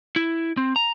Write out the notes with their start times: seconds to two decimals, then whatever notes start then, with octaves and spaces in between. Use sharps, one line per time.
0.16 E4
0.57 C4
0.76 A#5